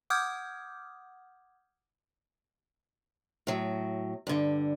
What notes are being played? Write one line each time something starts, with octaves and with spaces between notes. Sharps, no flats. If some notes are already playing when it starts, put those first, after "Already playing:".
F#5 D6 D#6 F6 G6 G#6
A2 F#3
G2 D3